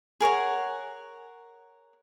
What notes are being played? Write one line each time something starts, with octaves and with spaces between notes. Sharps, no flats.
G#4 A#4 C#5 F#5